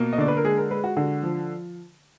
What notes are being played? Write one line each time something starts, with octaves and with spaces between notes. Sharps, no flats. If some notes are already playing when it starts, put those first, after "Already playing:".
Already playing: B2 A#3
D#5
D3 D5
B4
A#4
G#3 G#4
A#4
G#3 B4
F#4
D3 F#4
F3